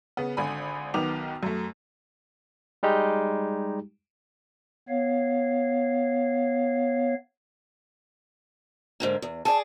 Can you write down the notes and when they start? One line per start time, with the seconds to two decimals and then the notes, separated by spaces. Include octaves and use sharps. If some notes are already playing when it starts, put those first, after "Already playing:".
0.17 C#3 B3
0.37 G#1 D3 G#5 B5
0.94 B1 D#3 B3 D6 F7
1.43 F#2 A3
2.83 G3 G#3 D#4 G4
4.88 B3 C#5 F5
9.00 G#2 D3 A#3
9.22 E2
9.45 G#4 D5 A5